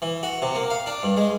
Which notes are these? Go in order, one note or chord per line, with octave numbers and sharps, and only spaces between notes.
E3
F#4
C3
A#3
F5
D4
G2
G#3